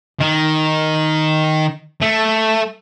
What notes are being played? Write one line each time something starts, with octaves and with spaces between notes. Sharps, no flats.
D#3
A3